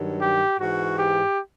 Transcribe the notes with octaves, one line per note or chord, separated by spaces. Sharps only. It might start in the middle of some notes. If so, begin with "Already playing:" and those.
Already playing: G2 D#3 F#3
G4
G#2 E3 F#4
G4